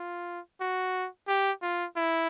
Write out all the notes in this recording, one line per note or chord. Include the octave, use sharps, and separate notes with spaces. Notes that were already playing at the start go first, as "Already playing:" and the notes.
Already playing: F4
F#4
G4
F4
E4